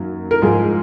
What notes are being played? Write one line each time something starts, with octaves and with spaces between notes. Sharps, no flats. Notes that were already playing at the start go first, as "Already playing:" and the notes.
Already playing: F#2 D#3 F#3 A#3
A#4
G#2 F3 G#3 G#4